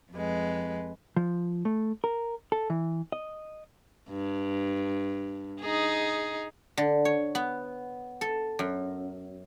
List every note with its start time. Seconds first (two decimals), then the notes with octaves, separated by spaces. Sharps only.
0.13 F2 G#3 B4
1.16 F3
1.65 A3
2.04 A#4
2.52 A4
2.70 E3
3.12 D#5
4.10 G2
5.61 D#4 G#4
6.77 D3
7.05 C#5
7.35 B3
8.21 A4
8.59 F#2